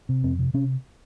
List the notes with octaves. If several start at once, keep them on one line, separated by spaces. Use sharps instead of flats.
C3
F2 C4
C3
C3 C#4